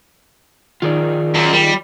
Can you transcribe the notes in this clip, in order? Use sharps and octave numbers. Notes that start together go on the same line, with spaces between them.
D#3 F4 G#4 D5
F#2
G3